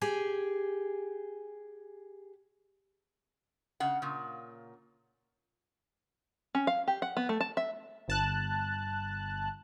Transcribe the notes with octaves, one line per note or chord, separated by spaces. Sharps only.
G4 G#4 G#5
C#3 F#5
A#2 C#3
C#4
F5
G4
F#5
B3
A3
A5
E5
G1 A5 F#6